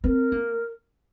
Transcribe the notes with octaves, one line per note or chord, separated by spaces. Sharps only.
C4 A#4 B4
A#3